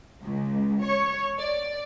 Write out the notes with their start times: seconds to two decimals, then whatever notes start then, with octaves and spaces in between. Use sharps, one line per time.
0.24 C#2
0.85 C#5
1.39 D5